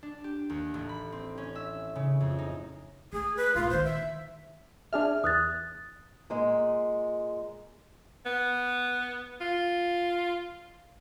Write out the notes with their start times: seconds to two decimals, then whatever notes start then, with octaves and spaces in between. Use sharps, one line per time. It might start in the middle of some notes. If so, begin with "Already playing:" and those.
0.03 D4
0.24 G4
0.50 D#2
0.74 A1
0.89 B5
1.12 C4
1.38 C#4
1.55 E5
1.95 C#3
2.21 F2
2.39 D#4
3.13 A3 G#4
3.37 B4
3.55 A#2 A3 F4
3.70 D3 D#3 C5
3.84 E5
4.93 D4 G#4 E5 F6
5.24 E2 D#6 F#6 A6
6.30 A#2 G#3
8.26 B3
9.41 F4